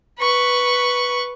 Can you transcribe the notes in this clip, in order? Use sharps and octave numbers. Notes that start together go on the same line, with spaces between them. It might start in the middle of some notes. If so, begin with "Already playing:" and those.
B4 C#6